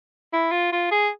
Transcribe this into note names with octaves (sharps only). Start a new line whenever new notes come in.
E4
F4
F4
G#4